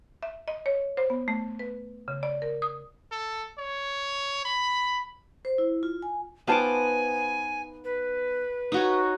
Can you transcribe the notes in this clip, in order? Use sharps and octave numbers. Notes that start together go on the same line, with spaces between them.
E5
D#5
C#5
C5
B3
A3
B4
C#3
D5
A#4
D#6
A4
C#5
B5
C5
E4
F4
G#5
B3 D#4 F4 C5 G#5 A5 D6
B4
D#4 F#4 C#5